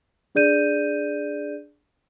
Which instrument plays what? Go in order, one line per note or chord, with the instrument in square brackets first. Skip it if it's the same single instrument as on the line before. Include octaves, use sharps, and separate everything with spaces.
[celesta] D4 G#4 D5 G6 D#7